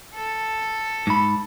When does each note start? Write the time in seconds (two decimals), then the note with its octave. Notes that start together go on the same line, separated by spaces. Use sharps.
0.15 A4
1.07 G#2 B5